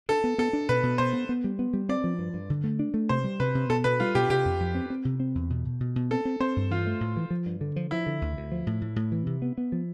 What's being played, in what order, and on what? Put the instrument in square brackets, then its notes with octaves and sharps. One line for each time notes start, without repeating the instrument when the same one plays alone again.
[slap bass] D4 [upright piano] A4
[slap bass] B3
[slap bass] B3 [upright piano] A4
[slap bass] D4
[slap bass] B2 [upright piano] B4
[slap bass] B2
[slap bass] B2 [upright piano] C5
[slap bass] B3
B3
G3
B3
G3
[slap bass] C4 [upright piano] D5
[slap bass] F3
G2
G2
D3
A3
D4
A3
[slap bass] C3 [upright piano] C5
[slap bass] G3
[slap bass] C3 [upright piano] B4
[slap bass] C3
[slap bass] B2 [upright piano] A4
[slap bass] B2 [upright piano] B4
[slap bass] G3 [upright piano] F4
[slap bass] B2 [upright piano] G4
[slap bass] C3 [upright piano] G4
[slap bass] F2
F2
C4
C4
C3
C4
E2
B2
B2
B2
B2
[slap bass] C4 [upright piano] A4
[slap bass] C4
[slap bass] C4 [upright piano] C5
[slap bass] G2
[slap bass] E3 [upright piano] F4
[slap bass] A3
A2
E3
F3
G2
D3
F3
[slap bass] F3 [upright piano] E4
[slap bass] D3
D2
D2
F3
A2
A2
A2
E3
C3
B3
B3
F3